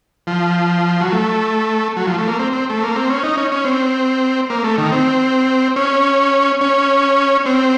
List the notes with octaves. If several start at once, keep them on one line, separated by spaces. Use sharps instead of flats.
F3
F#3
A3
F#3
F3
A3
A#3
C4
C4
A3
A#3
C4
C#4
D#4
C#4
C#4
C4
A#3
A3
D#3
C4
C#4
C#4
C4